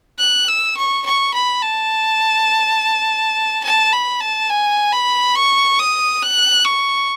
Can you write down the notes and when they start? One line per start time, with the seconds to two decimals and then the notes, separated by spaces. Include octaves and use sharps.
0.19 F#6
0.48 E6
0.76 C#6
1.05 C#6
1.34 B5
1.62 A5
3.63 A5
3.93 B5
4.20 A5
4.50 G#5
4.92 B5
5.35 C#6
5.79 D#6
6.22 F#6
6.64 C#6